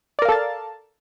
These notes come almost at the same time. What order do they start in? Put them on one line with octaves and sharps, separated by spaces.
D5 A#4 F5 A4 A5